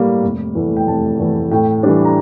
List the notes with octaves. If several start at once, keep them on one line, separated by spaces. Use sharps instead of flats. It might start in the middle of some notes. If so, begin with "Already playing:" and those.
Already playing: A2 G3 A#3
F1
E2 E3 A3
G5
F1 A5
E2 E3 A3
A2 G5
E3 G3 D4
A#5